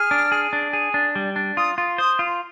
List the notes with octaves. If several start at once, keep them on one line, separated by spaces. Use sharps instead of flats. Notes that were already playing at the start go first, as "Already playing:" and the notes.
Already playing: G#4 F6
D4
G#4
D4
G#4
D4
G3
D4
F4 D#6
F4
C5 D#6
F4